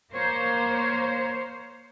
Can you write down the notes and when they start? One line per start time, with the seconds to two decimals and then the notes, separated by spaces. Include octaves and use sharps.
0.13 A#3 C5 C#5